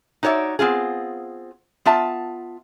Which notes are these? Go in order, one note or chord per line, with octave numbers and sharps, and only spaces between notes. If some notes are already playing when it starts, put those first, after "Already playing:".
D#4 F#4 C#5 D5 E5
B3 C4 F4 G#4
B3 F4 E5 A5